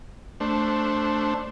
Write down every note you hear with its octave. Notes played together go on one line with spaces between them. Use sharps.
A3 D4 C5